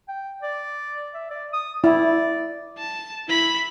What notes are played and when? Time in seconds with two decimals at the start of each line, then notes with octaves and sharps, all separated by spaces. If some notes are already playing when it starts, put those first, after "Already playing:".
0.08 G5
0.42 D5
1.14 E5
1.31 D5
1.53 D#6
1.84 E4 D5
2.78 A5
3.28 E4 B5